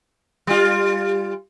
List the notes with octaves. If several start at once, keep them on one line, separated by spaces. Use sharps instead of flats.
G3 F4